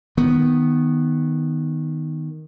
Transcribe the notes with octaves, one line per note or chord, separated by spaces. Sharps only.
D#3 B3